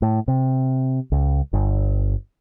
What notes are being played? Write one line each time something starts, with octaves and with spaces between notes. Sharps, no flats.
A2
C3
C#2
G1